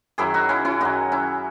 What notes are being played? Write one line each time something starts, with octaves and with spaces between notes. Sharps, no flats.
F#2 D#3 F#3 E4 G#4
D#4 F#4
C#4 E4
C#4 E4
F#2 D#3 F#3 D#4 F#4
C#4 E4